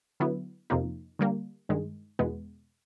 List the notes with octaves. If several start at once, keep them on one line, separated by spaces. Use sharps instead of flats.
D3 F#3 B3 E4
F2 C3 F3 A#3 D#4
D3 G3 A#3
G2 D#3 G#3
E2 B2 G#3 B3